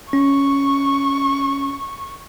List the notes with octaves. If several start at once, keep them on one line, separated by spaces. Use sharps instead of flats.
C#4 C#6